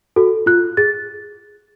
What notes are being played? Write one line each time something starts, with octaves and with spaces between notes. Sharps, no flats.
F#4 A4
F4 F#6
G#4 A6